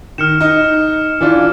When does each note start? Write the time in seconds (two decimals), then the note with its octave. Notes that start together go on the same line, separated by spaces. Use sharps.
0.18 D#3 F6 C#7 E7
0.41 D#4
1.21 E3 D4 F4